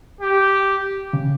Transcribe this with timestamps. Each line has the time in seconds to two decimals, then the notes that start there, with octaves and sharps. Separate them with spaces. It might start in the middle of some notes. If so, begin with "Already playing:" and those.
0.21 G4
1.13 C#3